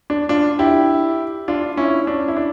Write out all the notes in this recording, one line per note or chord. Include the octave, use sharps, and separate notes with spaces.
D4
D4 F4
E4 G4
D4 F4
C#4 E4
D4
E4
D4